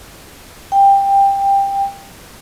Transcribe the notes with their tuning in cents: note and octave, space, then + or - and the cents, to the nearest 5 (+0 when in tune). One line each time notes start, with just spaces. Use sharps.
G5 +15